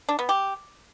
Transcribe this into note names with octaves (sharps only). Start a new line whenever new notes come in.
D4
B3
G4